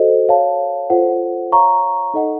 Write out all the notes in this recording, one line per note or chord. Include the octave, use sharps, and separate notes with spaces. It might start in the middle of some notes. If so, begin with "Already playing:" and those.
Already playing: F#4 A4 C5 D#5
C#5 F5 A5
F4 A4 C5 F#5
C#5 F5 A#5 C#6
D#4 A4 D#5 F#5